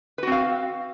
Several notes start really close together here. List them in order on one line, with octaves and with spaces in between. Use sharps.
B4 F#4 C4 F5